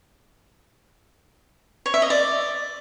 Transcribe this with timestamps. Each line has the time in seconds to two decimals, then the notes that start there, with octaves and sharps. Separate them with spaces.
1.86 C#5
1.94 E5
2.02 D#5
2.10 D5